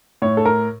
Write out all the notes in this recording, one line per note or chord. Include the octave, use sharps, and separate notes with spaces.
A2 C#5
A4
A#4